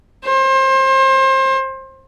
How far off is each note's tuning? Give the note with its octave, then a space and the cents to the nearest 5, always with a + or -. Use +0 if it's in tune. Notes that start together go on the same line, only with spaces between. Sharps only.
C5 +30